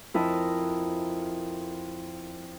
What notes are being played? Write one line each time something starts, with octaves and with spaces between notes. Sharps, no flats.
F2 E4 A#4 D#5 A5